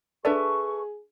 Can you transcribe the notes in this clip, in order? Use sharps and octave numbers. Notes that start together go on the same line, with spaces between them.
D4 G#4 A4 B4 D5 E5 C#6